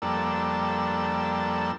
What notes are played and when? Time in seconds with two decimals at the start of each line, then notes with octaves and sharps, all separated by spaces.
0.02 F2 G3 A#3 D4 A4 E6